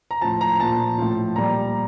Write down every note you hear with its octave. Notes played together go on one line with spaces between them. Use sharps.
A#5
A2 F3 A5
A#5
A#2 F3 A5
A2 F3
A#2 G3 A#5